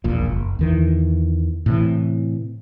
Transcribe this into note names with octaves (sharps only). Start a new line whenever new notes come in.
E1 A#1 A#2
F#1
E2 D#3 E3
A2 C3 E3